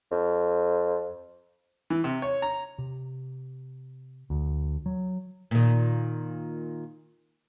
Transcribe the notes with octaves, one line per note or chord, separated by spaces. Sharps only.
F2
E3
C3
C#5
A#5
C3
D2
F#3
A#2 D#3